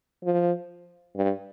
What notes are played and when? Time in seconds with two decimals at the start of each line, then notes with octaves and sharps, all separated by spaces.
0.24 F3
1.16 G2